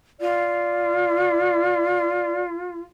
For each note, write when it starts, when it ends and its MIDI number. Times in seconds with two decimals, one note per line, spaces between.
0.20 2.81 65
0.20 2.42 74